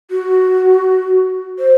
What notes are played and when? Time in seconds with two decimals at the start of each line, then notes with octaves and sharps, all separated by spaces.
0.11 F#4
1.59 C5